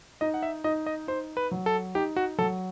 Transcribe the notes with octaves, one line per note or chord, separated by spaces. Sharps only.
D#4 D#5
F#5
E5
D#4 D#5
D#5
D#4 C5
B4
F#3
A4
D#4 G4
F#4
F#3 A4